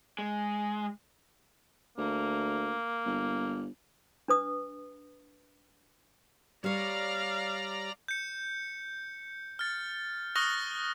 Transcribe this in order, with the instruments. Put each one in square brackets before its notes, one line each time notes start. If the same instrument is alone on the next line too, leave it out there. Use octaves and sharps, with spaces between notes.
[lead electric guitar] G#3
[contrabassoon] D2 [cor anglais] A#3
[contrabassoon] G1
[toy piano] D4 B4 D#6
[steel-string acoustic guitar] G3 C#5 [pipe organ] D5 A#5 [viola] F5
[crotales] G6 C#7
F6 A6
C#6 D#6 F6 F#6 A#6 G7